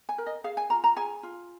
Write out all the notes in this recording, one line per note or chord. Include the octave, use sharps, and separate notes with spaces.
G#5
A#4
D#5
G#4 F5
G#5
F4 A#5
A#5
G#4 G#5
F4